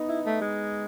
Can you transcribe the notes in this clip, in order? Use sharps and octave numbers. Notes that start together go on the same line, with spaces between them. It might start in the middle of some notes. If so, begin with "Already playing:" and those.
Already playing: B3 D#4
E4
A3
G#3